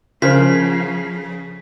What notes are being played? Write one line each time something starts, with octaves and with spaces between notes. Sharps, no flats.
C#3 F3 F4 A#4 C5 B6